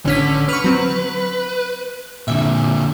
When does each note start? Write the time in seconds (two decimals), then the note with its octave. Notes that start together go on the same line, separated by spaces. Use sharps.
0.06 A1 D3 C#4 B6
0.49 B4 C#6 F6
0.64 F#3 C4
2.28 A#2 D3 E5